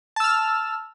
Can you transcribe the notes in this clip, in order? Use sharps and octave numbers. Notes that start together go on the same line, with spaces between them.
A5 E6 F6